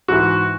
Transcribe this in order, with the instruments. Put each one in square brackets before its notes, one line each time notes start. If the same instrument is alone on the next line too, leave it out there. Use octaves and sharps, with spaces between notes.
[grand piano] G#2 E3 F#4